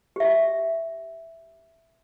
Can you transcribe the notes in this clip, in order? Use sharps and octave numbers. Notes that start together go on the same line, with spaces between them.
G4 E5